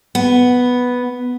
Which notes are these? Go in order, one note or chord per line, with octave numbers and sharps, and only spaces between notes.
B3